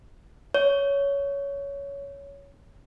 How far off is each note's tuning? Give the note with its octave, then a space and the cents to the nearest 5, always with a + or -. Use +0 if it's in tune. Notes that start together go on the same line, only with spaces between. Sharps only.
C#5 +15